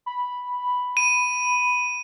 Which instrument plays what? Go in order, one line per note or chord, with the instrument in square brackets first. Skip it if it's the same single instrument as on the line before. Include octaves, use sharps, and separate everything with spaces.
[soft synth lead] B5
[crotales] D#7